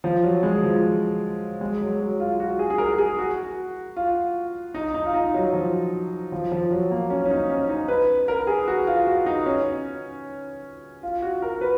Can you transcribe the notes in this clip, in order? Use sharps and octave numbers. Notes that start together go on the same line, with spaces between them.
F3
F#3
G#3
F3
G#3
F#3
F#3
F4
F#4
G#4
G#4
A#4
G#4
F#4
F4
D#4
D#4
F4
D#4
F#3
F3
F3
F3
F#3
A#3
C#4
C#4
D#4
C#4
D#4
B4
A#4
G#4
F#4
F4
F#4
D#4
C#4
F4
F#4
A#4
B4